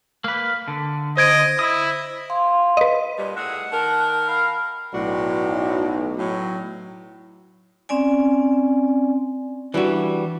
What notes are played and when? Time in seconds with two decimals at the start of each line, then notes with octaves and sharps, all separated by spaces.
0.24 A#3 B4
0.68 D3
1.17 C5 D#5 G#6 D7
1.59 E4 D#6
2.30 F5 C6
2.77 B4 D#5
3.18 G2 A#2 G3
3.37 A2 G#4 E5 F#5
3.72 D#3 A#4 A5
4.27 F5 B5
4.94 B1 A2 D4 F#4
6.18 A2 F#3
7.89 C4 C#4 D5 G#5
9.74 E3 G3 D4 F#4